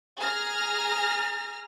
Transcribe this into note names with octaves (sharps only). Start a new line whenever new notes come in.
G#4 G#5 A#5 F6 A#6